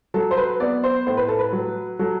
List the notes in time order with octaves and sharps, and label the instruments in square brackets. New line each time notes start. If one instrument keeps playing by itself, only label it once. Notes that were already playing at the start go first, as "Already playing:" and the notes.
[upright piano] F#3 A4
C5
B4
B3 D5
C5
A2 C5
B4
A4
B4
F#3
F#3 A4